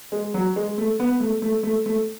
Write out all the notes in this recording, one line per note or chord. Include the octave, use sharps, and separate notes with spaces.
G#3
F#3
G#3
A3
B3
A3
A3
A3
A3